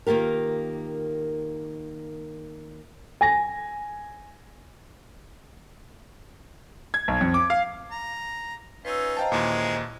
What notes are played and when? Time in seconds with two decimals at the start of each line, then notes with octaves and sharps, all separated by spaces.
0.07 D#3 A#3 F4 G4 A#4
3.21 G#5 A#6
6.94 G#6
7.08 B1
7.21 F2
7.34 D6
7.50 F5
7.91 A#5
8.85 C#4 D#4 F4 B4 E6
9.17 C5 D#5 F5 G5 A5 A#5
9.32 D#2 A#2 E3 G#3 C#4